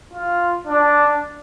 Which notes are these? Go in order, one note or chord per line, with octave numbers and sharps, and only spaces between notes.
F4
D4